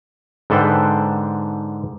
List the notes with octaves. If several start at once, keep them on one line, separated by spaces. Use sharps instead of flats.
G#2 D3 A4 B4 C5 G5